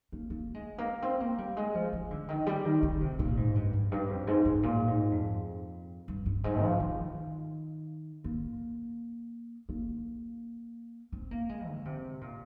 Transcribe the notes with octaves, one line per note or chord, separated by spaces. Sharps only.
A#3
A#3
G#3
A#3
C4
A#3
G3
G#3
F3
F3
D3
D#3
G3
D#3
D3
C3
A#2
G#2
G2
F2
G2
F2
G#2
G#2
A#2
G#2
F2
G2
G2
G#2
F3
D#3
A#3
A#3
C4
A#3
G#3
D3
C3
A#2